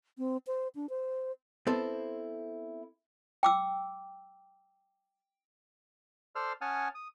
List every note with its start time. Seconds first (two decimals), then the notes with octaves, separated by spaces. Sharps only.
0.18 C4
0.47 C5
0.75 D4
0.89 C5
1.67 B3 C4 E4 A4 C5
3.43 G5 D6 E6
6.35 A4 C5 D5 C6 E6 F6
6.61 C#4 F#5 G#5 A5 D#6 F6
6.95 D#6